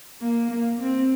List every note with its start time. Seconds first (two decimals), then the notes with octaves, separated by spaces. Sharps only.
0.21 A#3
0.50 A#3
0.80 C4